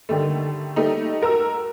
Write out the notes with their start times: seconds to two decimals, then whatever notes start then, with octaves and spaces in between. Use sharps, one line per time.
0.09 D3 D#3 G3 A3
0.76 G3 A3 D#4
1.21 F#4 A#4 A#5 E6